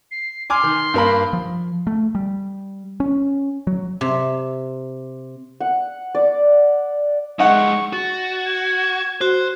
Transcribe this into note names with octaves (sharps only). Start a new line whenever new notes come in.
C7
G#5 C6 D6 F6
D#3
G2 A#3 B5
F3
A3
G3
C#4
F#3
C3
F#5
D5
F#2 G#3 D#4 F#5 C#6
F#4 A6
G#6
F#4 C5